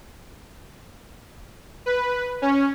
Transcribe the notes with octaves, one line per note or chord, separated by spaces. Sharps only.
B4
C#4